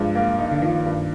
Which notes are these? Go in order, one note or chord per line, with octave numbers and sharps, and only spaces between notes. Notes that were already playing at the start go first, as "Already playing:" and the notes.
Already playing: G2 F3 G#3
A#3
D#4
D3
D#3 F3
G2